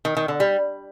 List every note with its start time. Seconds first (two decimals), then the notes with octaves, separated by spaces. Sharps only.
0.05 D#3
0.17 D#3
0.28 D3
0.40 G3